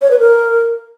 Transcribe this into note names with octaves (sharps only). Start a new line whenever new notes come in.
C#5
B4
A#4